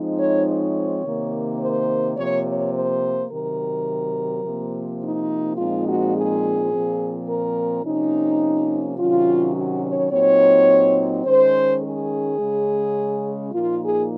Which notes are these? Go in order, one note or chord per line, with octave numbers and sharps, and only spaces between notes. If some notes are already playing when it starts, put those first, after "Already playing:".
Already playing: F3 G#3 C4 D#4
C#5
C#5
C3 D#3 A#3
C5
C3 F3 A#3 C#5
C#5
C5
C3 D#3 F#3 A#4
C3 F3 A#3
D#4
A#2 F3 G#3 C4 D#4 F4
F#4
G#4
A#2 F3 C4
A#4
C3 F3 A#3 C#4 D#4
C3 D#3 F#3 C#4 F4
F#4
C#5
A#2 F#3 C4 D#4 C#5
D#3 G#3 C#4 C5
G#4
C#3 G#3 C#4
A#2 F3 A#3 D#4 F4
G#4